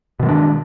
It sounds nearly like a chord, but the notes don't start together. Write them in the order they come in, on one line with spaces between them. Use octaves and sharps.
B2 D#3 G#3 D4